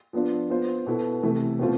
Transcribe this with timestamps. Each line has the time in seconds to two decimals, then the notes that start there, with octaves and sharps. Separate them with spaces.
0.13 F3 B3 D4 F4
0.50 B3 F4 C5
0.86 B2 B3 E4 A4
1.23 C3 E3 A3 E4
1.59 B2 A3 C4 F4